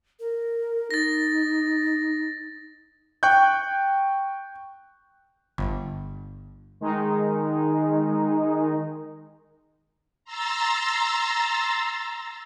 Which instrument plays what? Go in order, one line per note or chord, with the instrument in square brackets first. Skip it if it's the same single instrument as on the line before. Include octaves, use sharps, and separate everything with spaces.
[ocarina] A#4
[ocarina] D#4 [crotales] A6 A#6
[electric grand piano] G5 C#6 F#6 G6
[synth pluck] G1
[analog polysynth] D#3 G#3 D#4
[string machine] A#5 C6 E6 A6